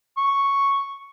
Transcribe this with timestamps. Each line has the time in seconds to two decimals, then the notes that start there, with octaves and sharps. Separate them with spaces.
0.17 C#6